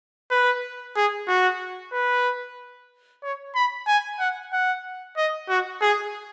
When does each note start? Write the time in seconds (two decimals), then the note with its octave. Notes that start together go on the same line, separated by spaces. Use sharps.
0.31 B4
0.97 G#4
1.28 F#4
1.93 B4
3.23 C#5
3.55 B5
3.88 G#5
4.19 F#5
4.53 F#5
5.17 D#5
5.49 F#4
5.82 G#4